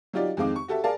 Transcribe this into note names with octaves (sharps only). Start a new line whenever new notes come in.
F#3 D#4 F4 G4 D5
F2 D#3 G#3 C4 F5 D6
C#6
F#4 G4 A4 E5
G#4 A#4 D5 F5 A5